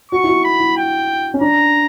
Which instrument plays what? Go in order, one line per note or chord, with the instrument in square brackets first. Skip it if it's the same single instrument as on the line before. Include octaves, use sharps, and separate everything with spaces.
[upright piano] F#4 [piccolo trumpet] C#6
[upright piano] E4
F#4
[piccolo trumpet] B5
[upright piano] E4
[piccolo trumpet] G5
[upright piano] C#4
[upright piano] D4 [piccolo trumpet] A#5